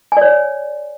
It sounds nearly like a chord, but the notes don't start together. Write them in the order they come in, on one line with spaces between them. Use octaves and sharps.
G#5 D5 C#5